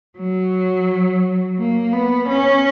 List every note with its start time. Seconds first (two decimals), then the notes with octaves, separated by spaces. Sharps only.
0.18 F#3
1.59 A#3
1.93 B3
2.29 C#4